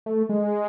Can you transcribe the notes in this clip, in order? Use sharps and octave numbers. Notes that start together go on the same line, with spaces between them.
A3
G#3